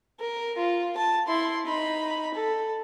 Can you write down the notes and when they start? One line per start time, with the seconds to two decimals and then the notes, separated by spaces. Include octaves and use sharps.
0.20 A#4
0.57 F4
0.97 A5
1.28 E4 C6
1.66 D#4 B5
2.34 A4